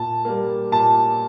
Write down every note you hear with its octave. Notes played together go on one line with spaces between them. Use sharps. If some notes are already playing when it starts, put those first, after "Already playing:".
Already playing: A#2 A5
G3 A#3
A#2 A5